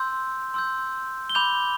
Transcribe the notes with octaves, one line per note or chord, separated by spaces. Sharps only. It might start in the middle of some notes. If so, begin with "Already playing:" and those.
Already playing: C6 E6 G6
C6 E6 G6
G7
B5 D6 G6 F7